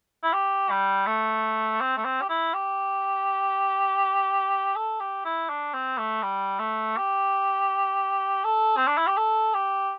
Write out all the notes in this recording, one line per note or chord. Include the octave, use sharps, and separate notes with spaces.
E4
G4
G3
A3
C4
A3
C4
G4
E4
G4
A4
G4
E4
D4
C4
A3
G3
A3
G4
A4
C4
D4
E4
G4
A4
G4